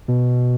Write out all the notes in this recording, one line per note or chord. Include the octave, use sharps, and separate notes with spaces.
B2